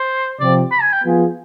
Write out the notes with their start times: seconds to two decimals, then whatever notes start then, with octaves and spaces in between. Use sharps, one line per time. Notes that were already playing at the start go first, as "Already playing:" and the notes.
Already playing: C5
0.40 C3 F3 C4 D5
0.72 B5
0.82 G#5
0.93 G5
1.03 F3 B3 F4 G#4